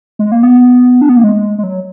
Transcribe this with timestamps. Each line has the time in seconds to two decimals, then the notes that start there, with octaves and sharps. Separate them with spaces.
0.19 G#3
0.32 A#3
0.43 B3
1.01 D4
1.09 B3
1.16 A#3
1.24 G#3
1.58 G#3
1.63 F#3